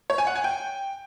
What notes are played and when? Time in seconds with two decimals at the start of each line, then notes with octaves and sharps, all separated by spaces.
0.10 C#5
0.18 G#5
0.27 F#5
0.36 G#5
0.44 G5